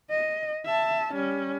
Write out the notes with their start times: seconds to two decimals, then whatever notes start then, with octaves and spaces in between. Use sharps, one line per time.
0.11 D#5
0.66 E5 A5
1.14 G3 C#4